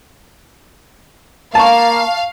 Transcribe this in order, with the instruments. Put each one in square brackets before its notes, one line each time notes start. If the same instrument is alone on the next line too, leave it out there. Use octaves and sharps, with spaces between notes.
[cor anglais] A#3 [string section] F5 [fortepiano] A5 C#6